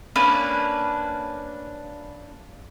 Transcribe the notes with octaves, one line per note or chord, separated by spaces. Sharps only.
A#3 C#4 D4 B4